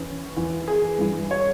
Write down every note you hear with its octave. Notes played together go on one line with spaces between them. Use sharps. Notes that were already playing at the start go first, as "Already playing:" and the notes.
Already playing: E2 E3 C#4
E2 E3
G#4
G2 E3
C#5